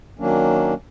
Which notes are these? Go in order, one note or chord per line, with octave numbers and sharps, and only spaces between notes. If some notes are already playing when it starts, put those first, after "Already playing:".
D#3 F#3 A#3 C#4 D4